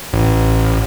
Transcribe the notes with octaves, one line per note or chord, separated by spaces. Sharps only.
A1